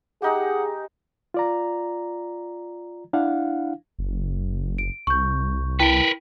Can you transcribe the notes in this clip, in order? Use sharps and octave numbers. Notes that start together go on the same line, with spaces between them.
G#3 D#4 G4 G#4 F#5
F4 D5 A#5
D4 E4 F5 F#5
F#1
D7
C2 C#6 G6
E4 A#4 B4 G5